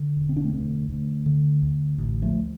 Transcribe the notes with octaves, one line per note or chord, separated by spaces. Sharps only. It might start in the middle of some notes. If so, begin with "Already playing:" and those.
Already playing: D3
E1
C4
D4
A3 C4
D2
D2
D3
D2
A1
F3 A3